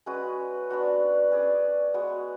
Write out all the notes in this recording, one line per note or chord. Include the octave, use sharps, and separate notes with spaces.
G#3 C#4 F#4 B4
B3 D4 F#4 C#5
C#4 G#4 D5
G#3 B3 F#4 C#5